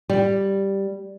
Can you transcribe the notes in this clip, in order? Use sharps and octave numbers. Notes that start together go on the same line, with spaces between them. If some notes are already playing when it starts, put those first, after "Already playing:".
G3